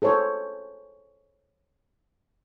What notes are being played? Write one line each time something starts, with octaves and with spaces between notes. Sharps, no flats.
G#4 A4 C5 C#5